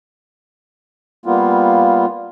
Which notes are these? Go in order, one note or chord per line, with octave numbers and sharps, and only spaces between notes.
G3 A#3 B3 F4